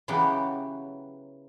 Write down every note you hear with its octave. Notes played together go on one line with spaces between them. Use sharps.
C#3 E3 F#3 B3 G4